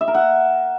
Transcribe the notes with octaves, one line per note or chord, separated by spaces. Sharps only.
E5
A#4
F#5